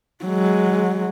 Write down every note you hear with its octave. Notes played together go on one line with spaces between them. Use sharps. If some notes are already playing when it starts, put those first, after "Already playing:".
F#3 G#3